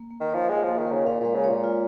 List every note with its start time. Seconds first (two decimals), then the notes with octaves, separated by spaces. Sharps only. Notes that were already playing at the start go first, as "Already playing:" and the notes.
Already playing: A#3
0.10 A#3
0.20 D#3
0.30 F3 C#5
0.49 G#3 F4
0.63 F3
0.68 A#3
0.78 D#3
0.87 C#3 A#3
1.06 A#2 F5
1.20 A#2 G#3
1.35 C#3
1.44 C#5
1.49 A#2
1.64 F4